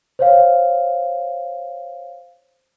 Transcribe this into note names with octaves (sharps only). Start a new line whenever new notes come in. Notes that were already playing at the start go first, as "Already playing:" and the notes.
C5 C#5 F5